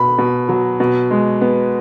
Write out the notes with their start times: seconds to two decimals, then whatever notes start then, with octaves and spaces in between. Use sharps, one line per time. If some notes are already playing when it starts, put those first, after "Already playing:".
Already playing: B2 B3 B5
0.18 B2
0.49 F#3
0.80 B2
1.11 G#3
1.41 B3